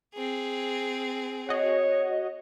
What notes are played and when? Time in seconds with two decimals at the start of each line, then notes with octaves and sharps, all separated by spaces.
0.14 C4 G#4
1.49 F#4 C#5 D#5